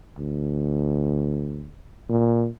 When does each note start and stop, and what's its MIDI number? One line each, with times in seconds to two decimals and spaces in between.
0.18 1.67 38
2.09 2.47 46